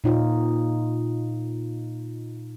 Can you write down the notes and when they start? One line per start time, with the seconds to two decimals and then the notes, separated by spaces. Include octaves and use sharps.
0.04 A#2 D#4 F4